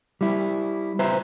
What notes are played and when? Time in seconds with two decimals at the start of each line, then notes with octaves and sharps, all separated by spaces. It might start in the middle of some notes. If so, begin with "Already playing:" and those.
0.21 G3 E4
0.99 B4 C5 E5 A#5